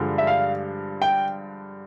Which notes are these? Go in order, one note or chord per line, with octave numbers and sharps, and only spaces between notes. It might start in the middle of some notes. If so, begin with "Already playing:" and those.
Already playing: G2 D3 F3 G#3
E5
F5
G5